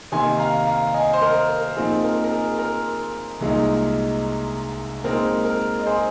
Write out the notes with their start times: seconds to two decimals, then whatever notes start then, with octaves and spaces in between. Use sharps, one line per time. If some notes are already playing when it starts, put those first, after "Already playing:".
0.12 C3 D#3 A#3 D#4 G#5 C6
0.39 F5 A#5
0.67 F5 A#5
0.94 D#5 G#5
1.13 C5
1.22 A#4 D#5
1.49 A#4
1.76 A#2 F3 C4 D#4 G#4
2.04 A#4
2.24 A#4
2.31 G#4
2.59 A#4
3.41 C2 A#2 G#3 D#4
5.04 A#2 G#3 C4 D#4 A#4
5.45 A#4
5.79 D#5
5.86 G#4 C5